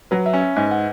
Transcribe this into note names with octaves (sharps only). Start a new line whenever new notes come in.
F#3 B4
E5
C#4
E5
G#2 G#5
F#5